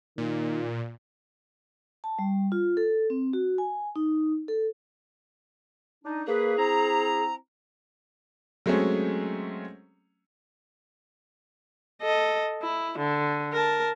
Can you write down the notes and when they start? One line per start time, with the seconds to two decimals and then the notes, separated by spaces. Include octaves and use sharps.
0.18 A#2 D#3
2.04 A5
2.19 G3
2.52 F4
2.77 A4
3.10 C4
3.33 F#4
3.58 G#5
3.96 D#4
4.48 A4
6.04 D4 D#4
6.27 A#3 G#4 B4
6.57 C4 E4 A#5
8.66 F#3 G#3 A3 C4 C#4
12.02 A4 D#5
12.62 E4
12.98 D3
13.53 A#4 A5